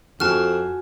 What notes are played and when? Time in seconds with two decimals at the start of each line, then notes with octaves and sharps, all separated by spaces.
0.20 F2 F#4 G#5 A5 F6